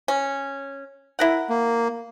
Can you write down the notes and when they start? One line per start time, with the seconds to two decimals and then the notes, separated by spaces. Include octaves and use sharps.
0.08 C#4
1.19 E4 A#4 F#5
1.50 A#3